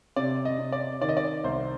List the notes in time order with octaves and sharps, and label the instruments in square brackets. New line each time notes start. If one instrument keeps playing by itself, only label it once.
[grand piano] C3 D5
D#5
C3
D5
D#3 D5
D#5
D5
C2 C5